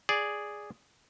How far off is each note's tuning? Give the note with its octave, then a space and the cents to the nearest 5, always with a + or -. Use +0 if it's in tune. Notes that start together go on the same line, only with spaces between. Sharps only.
G#4 +0 D5 +0